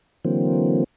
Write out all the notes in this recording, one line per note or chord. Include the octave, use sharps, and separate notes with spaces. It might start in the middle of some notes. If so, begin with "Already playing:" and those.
D3 E3 F#3 A#3 C4